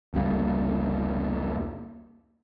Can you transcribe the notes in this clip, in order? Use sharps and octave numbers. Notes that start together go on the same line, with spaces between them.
F1 C#2 G3 A#3